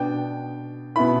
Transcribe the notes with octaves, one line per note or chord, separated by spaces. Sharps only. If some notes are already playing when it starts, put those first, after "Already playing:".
Already playing: B2 B3 D4 G5
B2 B3 E4 B5